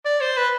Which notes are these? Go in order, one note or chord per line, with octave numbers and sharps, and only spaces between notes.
D5
C5
B4